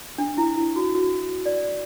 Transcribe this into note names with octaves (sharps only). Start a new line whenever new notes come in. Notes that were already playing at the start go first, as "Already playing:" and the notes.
D4
E4
E4
F#4
F#4
D5